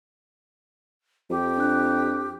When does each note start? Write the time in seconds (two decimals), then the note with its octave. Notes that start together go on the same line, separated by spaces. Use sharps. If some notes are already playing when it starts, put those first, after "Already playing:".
1.30 F2 G4
1.58 D4 F#6